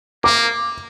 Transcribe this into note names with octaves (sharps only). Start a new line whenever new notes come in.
A#3 D6